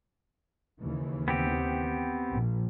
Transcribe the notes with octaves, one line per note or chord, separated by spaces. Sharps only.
D#2 C#3 E3
B3 C4 G4
A#1